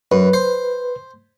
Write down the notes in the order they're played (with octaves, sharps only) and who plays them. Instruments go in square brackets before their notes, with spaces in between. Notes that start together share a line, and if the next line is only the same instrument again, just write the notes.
[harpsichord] F#2 [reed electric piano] B4
[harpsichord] C5